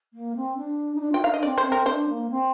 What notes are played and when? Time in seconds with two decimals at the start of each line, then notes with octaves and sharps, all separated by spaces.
0.13 A#3
0.36 C4
0.57 D4
0.95 D#4
1.00 D4
1.11 F4 G5
1.21 D#4 F5
1.32 D4 D#5
1.43 C4 D5
1.58 C5
1.64 C4
1.72 A#4
1.86 D4 C5
2.08 A#3
2.30 C4